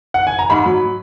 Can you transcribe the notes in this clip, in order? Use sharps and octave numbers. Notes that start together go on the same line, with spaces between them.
F#5
G#5
A#5
G#2 B5
F#3